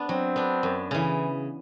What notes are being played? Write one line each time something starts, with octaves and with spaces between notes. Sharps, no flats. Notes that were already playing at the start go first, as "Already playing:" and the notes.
Already playing: B3 D4
F#3 C4
B3 D4
F#2
C#3 E3